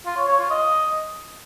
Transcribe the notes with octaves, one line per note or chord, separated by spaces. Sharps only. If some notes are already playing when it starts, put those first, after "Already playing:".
F4
C#5
C#5
F4
D#5